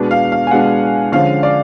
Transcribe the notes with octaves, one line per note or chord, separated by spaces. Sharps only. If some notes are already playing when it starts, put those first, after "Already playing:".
Already playing: B2 G#3 B3 D4
F5
F5
G#5
B2 G#3 B3 D4 F#5
D3 F3 G#3 C#4 F5
D5